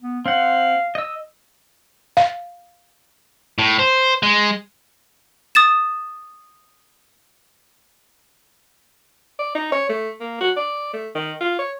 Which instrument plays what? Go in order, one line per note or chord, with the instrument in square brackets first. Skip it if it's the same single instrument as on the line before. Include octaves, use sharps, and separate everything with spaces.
[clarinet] B3
[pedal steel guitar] C4 F#5 [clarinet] F5
[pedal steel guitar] D#5 E6
[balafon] F5
[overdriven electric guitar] A2
C5
G#3
[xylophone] D#6 A6 E7
[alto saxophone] D5
D#4
C#5
A3
A#3
F#4
D5
A3
D#3
F4
C#5